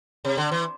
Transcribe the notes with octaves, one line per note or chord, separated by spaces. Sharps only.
C3
D3
E3